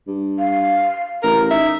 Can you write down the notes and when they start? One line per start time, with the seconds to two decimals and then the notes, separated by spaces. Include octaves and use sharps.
0.07 G2
0.39 F5
1.23 A1 A#4 A#5
1.51 D#4 E5